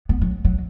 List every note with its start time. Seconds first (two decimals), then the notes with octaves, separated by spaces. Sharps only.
0.09 B3
0.21 F#3
0.45 F#3